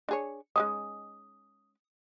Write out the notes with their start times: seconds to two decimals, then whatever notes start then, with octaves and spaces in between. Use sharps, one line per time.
0.09 D4 G#4 C#5
0.56 G#3 C#4 D#4 D#6